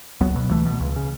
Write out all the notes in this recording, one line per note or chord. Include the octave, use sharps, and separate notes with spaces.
C#2 F#3 B3
B2 F#3
C#2 E3 A3
B2
C#2
C#3